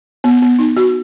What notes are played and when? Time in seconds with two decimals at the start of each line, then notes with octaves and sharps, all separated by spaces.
0.24 B3
0.42 B3
0.59 D#4
0.76 F#4